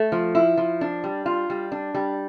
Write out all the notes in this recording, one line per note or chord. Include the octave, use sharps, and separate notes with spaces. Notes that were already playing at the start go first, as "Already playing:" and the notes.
Already playing: A3
F3
E4
F3
D4
G3
F4
G3
D4
G3